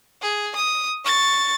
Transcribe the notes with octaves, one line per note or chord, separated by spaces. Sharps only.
G#4
D#6
C#6 A6